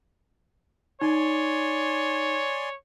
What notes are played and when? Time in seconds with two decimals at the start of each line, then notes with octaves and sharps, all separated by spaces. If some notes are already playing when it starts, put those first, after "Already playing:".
1.01 D#4 C#5 D5 G#5 C6